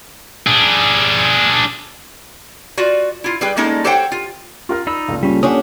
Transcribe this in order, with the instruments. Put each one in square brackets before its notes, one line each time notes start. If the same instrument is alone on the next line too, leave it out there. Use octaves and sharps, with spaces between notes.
[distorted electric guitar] D4 G#4
[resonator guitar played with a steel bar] F4 F#4 D5
E4 F4
G3 G#4 B4 G5
G3 G#3 A#3 C#4 D#4 A4
G4 A4 C5 C#5 F#5 G5
F4
[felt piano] F4 A#4 F6
[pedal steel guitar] D#4 D5 E6 [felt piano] B5
[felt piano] C#2 [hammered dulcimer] A#2 A4
[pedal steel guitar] G3 C#4
[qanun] C#4 D4 G4 [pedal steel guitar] F#5 C#6 D#6